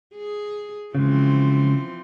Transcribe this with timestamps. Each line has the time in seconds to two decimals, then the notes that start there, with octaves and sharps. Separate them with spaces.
0.15 G#4
0.95 C#3 E3 F3 G#3 C4